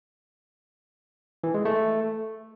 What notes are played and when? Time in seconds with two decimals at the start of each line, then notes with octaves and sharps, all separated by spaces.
1.44 E3
1.54 G#3
1.65 A3